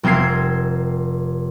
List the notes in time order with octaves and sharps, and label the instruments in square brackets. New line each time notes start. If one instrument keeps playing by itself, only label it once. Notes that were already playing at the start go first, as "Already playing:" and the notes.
[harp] F1 C4 A#4 G#6 C7